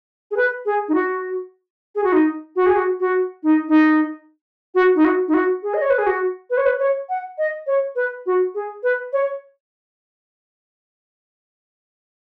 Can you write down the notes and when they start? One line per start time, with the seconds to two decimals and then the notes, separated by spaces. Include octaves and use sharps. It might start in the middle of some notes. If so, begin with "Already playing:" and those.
0.31 G#4
0.37 B4
0.66 G#4
0.89 D#4
0.94 F#4
1.95 G#4
2.04 F#4
2.12 D#4
2.56 F#4
2.66 G#4
2.76 F#4
3.00 F#4
3.43 D#4
3.68 D#4
4.75 F#4
4.95 D#4
5.05 F#4
5.28 D#4
5.34 F#4
5.63 G#4
5.74 D#5
5.82 C#5
5.90 B4
5.98 G#4
6.06 F#4
6.50 B4
6.57 C#5
6.66 B4
6.79 C#5
7.09 F#5
7.38 D#5
7.67 C#5
7.96 B4
8.26 F#4
8.55 G#4
8.83 B4
9.13 C#5